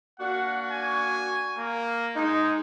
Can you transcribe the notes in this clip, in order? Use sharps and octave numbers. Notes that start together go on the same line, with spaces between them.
A#3 D4 F#4 F#5
G#5
A#3
G#3 D#4